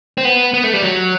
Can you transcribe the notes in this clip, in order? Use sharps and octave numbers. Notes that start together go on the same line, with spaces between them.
C4
B3
B3
A3
G3
F#3